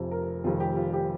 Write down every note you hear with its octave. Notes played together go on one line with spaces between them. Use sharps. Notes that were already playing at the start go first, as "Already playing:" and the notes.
Already playing: F1 F2 C3 F3
A#4
F1 F2 D#3 G3 F4
G4
F4
G4